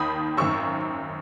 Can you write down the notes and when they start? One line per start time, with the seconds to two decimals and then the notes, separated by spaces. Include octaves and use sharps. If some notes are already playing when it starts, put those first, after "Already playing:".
Already playing: D#2 D#3 B5 D#6
0.37 G#1 F#2 D#3 C#6 E6